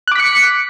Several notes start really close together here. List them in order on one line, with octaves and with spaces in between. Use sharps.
F#6 D6 B6 C#7